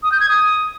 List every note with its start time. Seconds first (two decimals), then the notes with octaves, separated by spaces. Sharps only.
0.03 D#6
0.12 G6
0.20 G#6
0.29 D#6